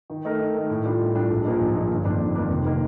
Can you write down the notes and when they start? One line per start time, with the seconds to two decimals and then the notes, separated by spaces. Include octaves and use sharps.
0.10 D#3
0.25 A3 D#4 A#4
0.40 D#3
0.55 A3 D#4 A#4
0.70 A2
0.85 G3 D4 F4
1.00 A2
1.15 G3 D4 F4
1.30 A#1
1.45 A#2 F3 A#3 D#4
1.60 A#1
1.75 A#2 F3 A#3 D#4
1.90 G1
2.05 F2 D#3 A#3 D4
2.20 G1
2.35 F2 D#3 A#3 D4
2.50 F1
2.65 D#3 A#3 D#4